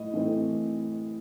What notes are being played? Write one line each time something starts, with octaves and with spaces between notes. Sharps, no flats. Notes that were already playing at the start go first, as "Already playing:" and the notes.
Already playing: A2 D#5
A2 E3 A3 C4